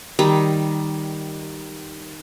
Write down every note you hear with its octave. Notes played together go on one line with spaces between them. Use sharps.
D#3 G3